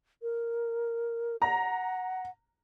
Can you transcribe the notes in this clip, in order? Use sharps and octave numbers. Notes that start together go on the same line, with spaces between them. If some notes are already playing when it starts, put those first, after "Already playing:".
A#4
F#5 A#5